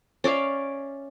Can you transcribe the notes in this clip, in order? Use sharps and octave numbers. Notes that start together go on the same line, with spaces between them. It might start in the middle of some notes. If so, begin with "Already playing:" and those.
C#4 D5 E5 F5